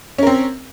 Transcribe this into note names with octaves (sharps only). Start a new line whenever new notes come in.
C4 C#4 A#4